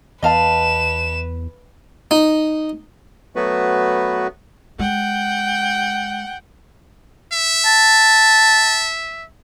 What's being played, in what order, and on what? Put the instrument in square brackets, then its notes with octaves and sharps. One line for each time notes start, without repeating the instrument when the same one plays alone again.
[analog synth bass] E2 [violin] B4 E7 [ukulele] D#5 F5 A5
[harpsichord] D#4
[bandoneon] F#3 A3 B3 F#4 B4
[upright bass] G#3 [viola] F#5 G5
[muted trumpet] E5
[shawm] A5